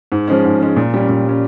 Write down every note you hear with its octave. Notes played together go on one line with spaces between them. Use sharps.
G#2
F3 G#3 C#4
G#2
F3 G#3 C#4
A#2
G3 C#4
A#2
G3 C#4